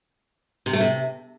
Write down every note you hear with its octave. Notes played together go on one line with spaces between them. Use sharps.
C3
A3
C3